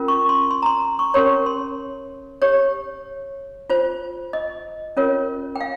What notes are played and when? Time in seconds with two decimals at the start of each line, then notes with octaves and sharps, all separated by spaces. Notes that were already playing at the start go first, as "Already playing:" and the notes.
Already playing: C#4 F4 A#4
0.08 C#6
0.29 C6
0.51 C6
0.62 A#5
0.66 C6
0.99 C#6
1.14 C#4 G4 A#4 C#5 C6
1.46 C6
2.42 G4 C#5
3.70 F4 C5
4.33 D#5
4.97 C#4 F4 A#4 C#5
5.56 G5
5.61 F5